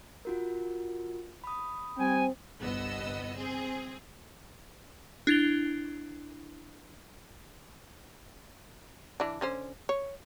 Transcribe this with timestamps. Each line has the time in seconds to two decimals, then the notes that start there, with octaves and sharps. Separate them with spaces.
0.25 F4 F#4 A#4
1.44 B5 D#6
1.98 G3 C4 G5 G#5
2.59 G1 C2 B3 D#5 E6
3.37 C4 G#4
5.27 D4 E4 A6 F7 G7
9.20 E3 D4
9.41 D3 C#4 C5
9.89 C#5